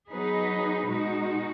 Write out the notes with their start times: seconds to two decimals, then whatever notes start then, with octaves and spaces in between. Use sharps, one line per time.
0.12 F#3 B3 D#4 G#4 B4
0.88 B2 G#3 D#4 F#4